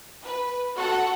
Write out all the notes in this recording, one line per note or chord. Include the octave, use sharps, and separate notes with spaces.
B4
F#4 A4 F#5